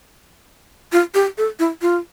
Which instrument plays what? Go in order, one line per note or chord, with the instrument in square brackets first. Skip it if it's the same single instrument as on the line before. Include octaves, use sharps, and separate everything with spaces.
[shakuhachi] F4
G4
A4
E4
F4